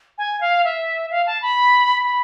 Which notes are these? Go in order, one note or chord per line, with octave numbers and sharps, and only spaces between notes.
G#5
F5
E5
F5
A5
B5
B5